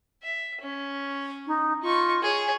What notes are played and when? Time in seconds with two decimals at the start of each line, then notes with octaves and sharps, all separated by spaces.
0.23 E5
0.61 C#4
1.47 D#4
1.83 D#4 F4 C#6
2.23 G#4 C#5 G#5